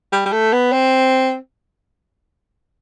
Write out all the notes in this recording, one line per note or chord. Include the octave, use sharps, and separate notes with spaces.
G3
G3
A3
B3
C4